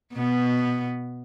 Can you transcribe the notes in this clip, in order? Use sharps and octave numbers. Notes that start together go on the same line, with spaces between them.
B2 B3